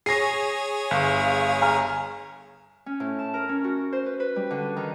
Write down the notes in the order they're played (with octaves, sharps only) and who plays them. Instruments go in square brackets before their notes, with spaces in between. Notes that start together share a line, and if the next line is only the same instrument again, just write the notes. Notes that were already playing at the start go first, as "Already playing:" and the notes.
[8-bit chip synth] G#4 C#5 [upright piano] A#6 C7
[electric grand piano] G1 [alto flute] F5
[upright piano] G#5 A#5 F6
[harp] C#4
A2
A5
A#4
C#4
F#4
C5
B4
B4
G3
D3
D#3